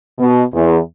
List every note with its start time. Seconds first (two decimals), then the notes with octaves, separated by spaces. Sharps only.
0.19 B2
0.53 E2